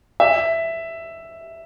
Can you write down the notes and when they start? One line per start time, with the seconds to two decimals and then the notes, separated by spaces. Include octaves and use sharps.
0.20 E5